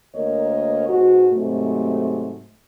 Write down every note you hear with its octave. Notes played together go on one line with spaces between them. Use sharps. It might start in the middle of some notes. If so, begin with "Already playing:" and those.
D2 A#3 A#4 C#5 D#5
G#2 B2 F#4
G#2 C3 F#3 A3